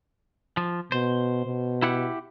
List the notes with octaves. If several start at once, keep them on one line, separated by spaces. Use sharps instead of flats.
F3
B2 C5
B2
E4 G4 F#5